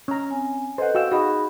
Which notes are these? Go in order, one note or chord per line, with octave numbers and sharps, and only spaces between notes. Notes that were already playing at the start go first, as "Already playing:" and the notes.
C#4 A#5
C4 G#5
A4 B4 C5 D#5 F#5
F#4 F5 G5 E6
D#4 F#4 G#4 D#5 B5